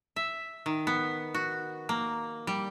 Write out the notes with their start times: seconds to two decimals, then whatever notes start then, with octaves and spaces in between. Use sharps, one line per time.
0.16 E5
0.66 D#3
0.87 B3
1.34 F#4
1.89 A#3
2.47 G3